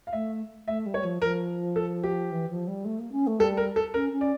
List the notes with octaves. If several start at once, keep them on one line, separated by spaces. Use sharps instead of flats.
F5
A3 E5
A3 E5
G3
C#5
F3
F3 A#4
A4
G4
E3
F3
G3
A3
A#3
C#4
A3
G3 A4
A#4
A4
C#4 A#4
C#4
D5